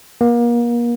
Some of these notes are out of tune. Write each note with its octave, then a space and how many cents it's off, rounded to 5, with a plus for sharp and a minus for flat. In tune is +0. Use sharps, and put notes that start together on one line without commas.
A#3 +35